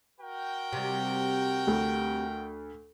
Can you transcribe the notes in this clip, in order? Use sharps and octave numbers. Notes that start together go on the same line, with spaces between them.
F#4 A#4 G5
C3 G3
D2